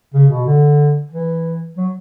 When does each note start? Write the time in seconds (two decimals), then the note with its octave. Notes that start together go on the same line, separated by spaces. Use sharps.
0.14 C#3
0.30 B2
0.46 D3
1.11 E3
1.77 F#3